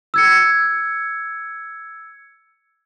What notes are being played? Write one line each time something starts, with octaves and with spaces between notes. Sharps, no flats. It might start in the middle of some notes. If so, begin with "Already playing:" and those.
E6 G#6 C#7